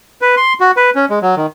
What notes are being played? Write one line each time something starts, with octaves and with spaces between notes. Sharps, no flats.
B4
C6
F#4
B4
C#4
G#3
F#3
D#3